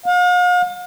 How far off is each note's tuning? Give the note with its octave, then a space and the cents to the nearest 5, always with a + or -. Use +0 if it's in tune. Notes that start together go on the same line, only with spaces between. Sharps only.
F5 +45